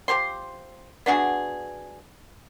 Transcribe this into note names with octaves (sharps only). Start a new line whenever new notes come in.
F3 G4 C5 C6
B3 D4 F#4 G#4